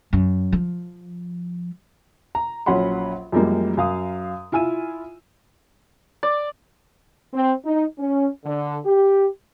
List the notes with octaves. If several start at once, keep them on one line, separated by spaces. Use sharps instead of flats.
F#2
F3
A#5
A#1 F#3 C#4 F#5 B5 C6
F#2 F3 G3 G#3 A#3
F#2 F5 D#6
E4 F4 G#5 E6 D#7
D5
C4
D#4
C#4
D3
G4